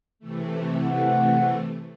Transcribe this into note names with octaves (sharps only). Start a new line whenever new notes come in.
C3 E3 A3
F#5